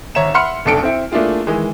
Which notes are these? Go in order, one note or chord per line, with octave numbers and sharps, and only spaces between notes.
G#1 C#5 E5 A#5 E7
E5 F#5 B5 C6 F6 C#7
F1 B1 D4 A4 C#7 D7
C4 E4
A3 A#3 D4 E4 F4 G#4
D#3 E3 G#3